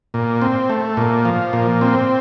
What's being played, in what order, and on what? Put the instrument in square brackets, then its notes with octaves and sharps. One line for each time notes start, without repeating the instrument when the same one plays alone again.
[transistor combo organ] A#2
C4
A3
A#2
F3
A#2
C4